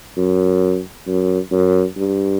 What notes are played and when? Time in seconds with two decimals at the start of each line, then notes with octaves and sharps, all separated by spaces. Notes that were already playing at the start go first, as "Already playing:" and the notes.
0.17 F#2
1.07 F#2
1.52 F#2
1.97 G2